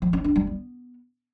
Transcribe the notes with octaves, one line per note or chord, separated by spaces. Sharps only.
F3
C#4
D4
G3
B3